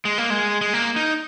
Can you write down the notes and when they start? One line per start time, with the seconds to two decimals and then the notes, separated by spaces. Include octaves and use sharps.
0.05 G#3
0.18 A#3
0.30 G#3
0.61 G#3
0.73 A#3
0.96 D#4